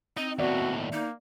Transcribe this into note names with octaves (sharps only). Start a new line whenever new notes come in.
C4 D#4 D#5
D#2 A2 B3 F#4 D5 E5
A#3 D#4